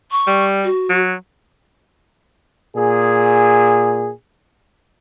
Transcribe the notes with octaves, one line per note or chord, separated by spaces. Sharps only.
C#6
G3
F#4
F#3
A#2 G#4